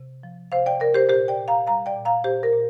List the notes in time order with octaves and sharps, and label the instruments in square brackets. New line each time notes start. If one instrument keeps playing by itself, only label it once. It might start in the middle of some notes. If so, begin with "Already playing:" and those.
Already playing: [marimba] C3
F3
C3 C5 F5
D5 G5
C3 A#4 D5
G4 C5
A#2 G4 C5
D5 G5
A#2
F5 A#5
G3 F5 A#5
D5 G5
A#2
F5 A#5
A#2 G4 C5
A#4
A#2